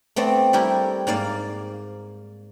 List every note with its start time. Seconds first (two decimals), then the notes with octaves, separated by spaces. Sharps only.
0.16 A3 B3 C4 D5
0.53 G3 A3 E4 G4 A#4
1.07 G#2 A#3 D5 F5